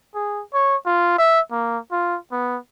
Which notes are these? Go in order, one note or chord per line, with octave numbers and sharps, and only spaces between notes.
G#4
C#5
F4
E5
A#3
F4
B3